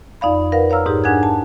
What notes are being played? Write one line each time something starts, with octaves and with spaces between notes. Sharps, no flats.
F2 D#4 D5 F5 B5
A#4 B4 F5 F#5
C#5 F5 A#5 E6 F6
G#2 D#4 G4 G#4
G#2 D4 F#5 G#5 F#6 G#6
A5